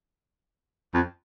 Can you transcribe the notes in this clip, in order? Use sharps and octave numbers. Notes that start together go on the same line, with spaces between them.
F2